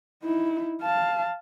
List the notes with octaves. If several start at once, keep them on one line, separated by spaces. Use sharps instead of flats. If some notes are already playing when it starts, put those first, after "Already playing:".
D#4 E4
F5 A5